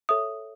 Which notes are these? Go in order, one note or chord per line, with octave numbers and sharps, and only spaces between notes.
A4 C#5 E5 D#6